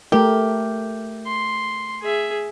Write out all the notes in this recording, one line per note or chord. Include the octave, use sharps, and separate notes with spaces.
A3 G4 A#4
C6
G#4 E5